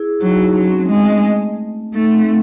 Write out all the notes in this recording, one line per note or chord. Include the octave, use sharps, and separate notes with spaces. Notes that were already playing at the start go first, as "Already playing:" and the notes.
Already playing: E4 G#4
F#3 D#4 F#4
E4
D#4
F#3 C#4
C4
A3
G#3 A3
A3 D#4
C4